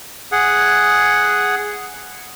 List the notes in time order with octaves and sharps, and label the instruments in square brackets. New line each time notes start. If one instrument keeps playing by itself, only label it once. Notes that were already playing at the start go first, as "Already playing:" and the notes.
[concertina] G#4 F#5